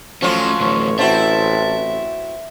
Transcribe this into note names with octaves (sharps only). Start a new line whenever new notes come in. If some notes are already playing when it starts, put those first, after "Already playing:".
F3 F#3 A3 C#4 F4 C#5
A1 D2 A2 C#5
C4 E4 F#4 E5 A5